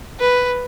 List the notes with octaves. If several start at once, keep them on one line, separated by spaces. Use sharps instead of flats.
B4